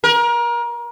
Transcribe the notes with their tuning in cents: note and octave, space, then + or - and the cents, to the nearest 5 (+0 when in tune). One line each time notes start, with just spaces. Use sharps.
A#4 +30